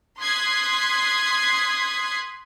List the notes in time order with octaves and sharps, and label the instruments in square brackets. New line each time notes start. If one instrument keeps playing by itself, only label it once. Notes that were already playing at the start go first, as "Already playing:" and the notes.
[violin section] C6 D#6 F#6 G#6 B6 C7